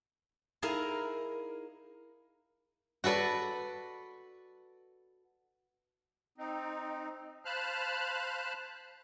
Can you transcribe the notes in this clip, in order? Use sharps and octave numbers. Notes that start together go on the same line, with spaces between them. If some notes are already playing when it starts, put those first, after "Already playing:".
D#4 E4 G#4 A#4 F5 A#5
F#4 A4 B4 D5
C4 D#4
C5 F5 A5 B5 F6 F#6